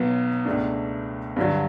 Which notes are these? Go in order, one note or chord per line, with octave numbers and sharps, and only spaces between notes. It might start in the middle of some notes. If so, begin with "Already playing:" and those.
Already playing: B1 B2 F#3 B3
C#2 B2 A3 D4
G2 D3 F#3